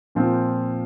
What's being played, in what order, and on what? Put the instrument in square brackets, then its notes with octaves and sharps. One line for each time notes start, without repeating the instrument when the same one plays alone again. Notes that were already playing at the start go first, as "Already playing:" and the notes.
[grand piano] A#2 F3 C4